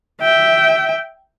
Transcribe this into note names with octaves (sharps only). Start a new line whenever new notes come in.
E5 G5